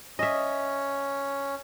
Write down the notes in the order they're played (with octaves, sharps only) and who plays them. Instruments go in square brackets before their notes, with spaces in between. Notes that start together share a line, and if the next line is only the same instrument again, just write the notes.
[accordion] C#4 [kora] D#5 E5